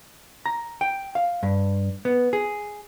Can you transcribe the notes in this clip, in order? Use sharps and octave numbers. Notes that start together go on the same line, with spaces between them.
A#5
G5
F5
G2
B3
G#4